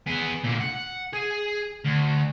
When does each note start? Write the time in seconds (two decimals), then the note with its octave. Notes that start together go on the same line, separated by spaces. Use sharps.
0.07 B3 G#4
0.44 A#2 D3
0.61 F#5
1.13 G#4
1.85 D2